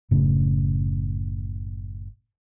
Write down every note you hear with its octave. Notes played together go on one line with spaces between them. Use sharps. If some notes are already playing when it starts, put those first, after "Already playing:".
F#1 A2 C#3